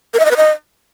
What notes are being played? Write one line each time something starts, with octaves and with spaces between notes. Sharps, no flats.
A#4
E5
D#5
B4
D#5